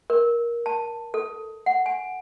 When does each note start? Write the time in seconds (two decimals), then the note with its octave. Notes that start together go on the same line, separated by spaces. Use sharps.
0.10 A#4
0.66 A5
1.14 A4
1.66 F#5
1.86 G#5